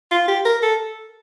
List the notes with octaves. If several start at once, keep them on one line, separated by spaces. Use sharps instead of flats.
F4
G4
A#4
A4